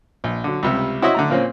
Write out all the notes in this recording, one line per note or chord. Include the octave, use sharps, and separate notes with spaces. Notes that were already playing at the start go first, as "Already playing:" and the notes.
A#1
D3 F#3
C#2 C3 G3
E4 F#4 C5 C#5 D#5 E5
D3 A3 A#5
A#2 A#3 C4 C#4